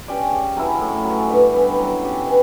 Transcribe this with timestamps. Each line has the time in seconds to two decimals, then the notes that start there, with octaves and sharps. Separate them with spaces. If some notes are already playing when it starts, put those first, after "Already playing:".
0.08 C#4 G4 D5
0.32 C#3
0.57 F#3 C#4 E4
0.81 A2
1.05 F#3 C#4
1.29 G2
1.54 E3 G3 B3
1.78 F#3
2.02 C#4 G4
2.26 E3